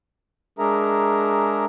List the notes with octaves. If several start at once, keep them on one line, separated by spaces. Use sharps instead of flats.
G#3 D4 G#4 A#4 E5 A#5